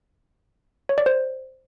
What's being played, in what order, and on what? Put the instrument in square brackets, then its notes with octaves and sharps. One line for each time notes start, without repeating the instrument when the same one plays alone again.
[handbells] C#5
D5
C5